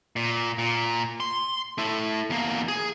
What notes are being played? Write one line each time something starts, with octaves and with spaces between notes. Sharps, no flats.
A#2
A#2
C6
A3 E4
E2 A#3
G#4